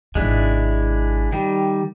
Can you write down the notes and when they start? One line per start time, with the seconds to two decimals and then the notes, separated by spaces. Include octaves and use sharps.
0.15 G#1 C3 G#3 D4 E4
1.32 D#3 G3